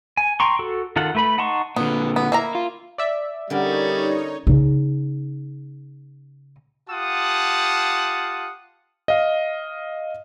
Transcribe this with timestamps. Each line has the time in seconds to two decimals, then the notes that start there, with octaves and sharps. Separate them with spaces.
0.17 G#5
0.40 G5 A#5 C6 C#6
0.59 F#4 A4
0.96 D#3 F4 A4 F#5
1.15 A3 B4 B5
1.38 D#4 F#5 A5 C6 C#6
1.76 A#2 D3 B3
2.16 B3
2.32 A#3 E4 A#5
2.55 F4
2.98 D5 E5
3.50 D3 G3 C#4 D#4 A#4 C#5
4.47 C#3 D#4
6.90 F4 G4 F#5 A5 D#6
9.08 D#5 F5